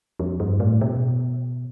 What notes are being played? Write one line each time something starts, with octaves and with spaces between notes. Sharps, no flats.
F2
G2
A2
B2